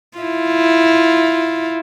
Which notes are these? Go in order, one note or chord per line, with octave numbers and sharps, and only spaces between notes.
E4 F4